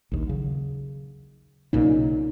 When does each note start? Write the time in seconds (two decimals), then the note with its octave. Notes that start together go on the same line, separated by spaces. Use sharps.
0.12 A#1 D#2
0.27 C#3 F#3
1.73 B1 A#2 C#3 D#4